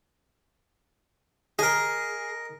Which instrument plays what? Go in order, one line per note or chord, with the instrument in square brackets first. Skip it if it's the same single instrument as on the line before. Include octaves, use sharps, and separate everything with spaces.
[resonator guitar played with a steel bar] G#4 [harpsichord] A#4 D#5